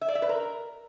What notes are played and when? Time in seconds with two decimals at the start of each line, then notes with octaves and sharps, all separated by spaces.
0.01 E5
0.08 D5
0.15 E5
0.22 B4
0.29 A#4